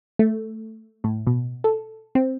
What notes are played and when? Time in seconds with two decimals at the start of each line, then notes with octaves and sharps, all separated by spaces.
0.19 A3
1.04 A2
1.27 B2
1.64 A4
2.15 C4